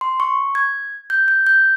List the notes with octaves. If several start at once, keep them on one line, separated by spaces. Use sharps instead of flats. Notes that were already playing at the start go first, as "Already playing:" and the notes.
C6
C#6
G#6
G6
G6
G6